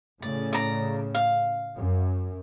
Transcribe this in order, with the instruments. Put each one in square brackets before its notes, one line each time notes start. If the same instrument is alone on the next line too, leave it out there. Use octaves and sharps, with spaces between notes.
[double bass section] A2 C#3 [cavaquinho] D5
[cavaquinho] D5 A#5
F5
[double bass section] F#2